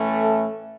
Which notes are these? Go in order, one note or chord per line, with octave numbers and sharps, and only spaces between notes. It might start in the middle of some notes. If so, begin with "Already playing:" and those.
Already playing: A2 E3 A3 C#4
A4